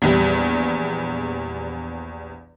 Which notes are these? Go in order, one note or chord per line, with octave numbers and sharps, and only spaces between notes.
A#1 E2 G3